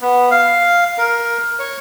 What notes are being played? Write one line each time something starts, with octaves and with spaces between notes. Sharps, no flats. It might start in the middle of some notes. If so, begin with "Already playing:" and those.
B3
F5
A#4
C#5